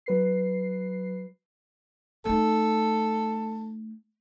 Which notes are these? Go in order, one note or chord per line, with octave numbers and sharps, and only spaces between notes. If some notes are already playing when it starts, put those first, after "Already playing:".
F#3 B4 C7
A3 D#4 A4